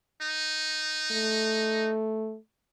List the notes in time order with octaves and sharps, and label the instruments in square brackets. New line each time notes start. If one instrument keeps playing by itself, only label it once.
[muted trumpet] D#4
[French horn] A3